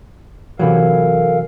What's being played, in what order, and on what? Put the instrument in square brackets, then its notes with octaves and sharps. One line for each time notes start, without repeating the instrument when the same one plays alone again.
[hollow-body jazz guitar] C3 E3 F#3 [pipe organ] A4 A#4 F5